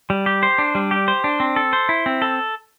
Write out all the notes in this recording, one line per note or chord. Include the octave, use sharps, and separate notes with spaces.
G3
G4
C5
D4
G3
G4
C5
D4
C4
A4
C5
E4
C4
A4